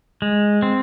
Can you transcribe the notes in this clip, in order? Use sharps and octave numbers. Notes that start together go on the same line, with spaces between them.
G#3
C4